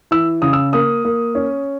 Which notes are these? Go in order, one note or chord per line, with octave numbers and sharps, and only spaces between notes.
E3 E6
C#3 D#6
E6
A#3 D#6
A#3
C#4